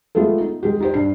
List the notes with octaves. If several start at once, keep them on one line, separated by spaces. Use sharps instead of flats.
G#3 A3 B3 F4 A4
D#4
G#3 G4
D#4 G4 C5
G2 C7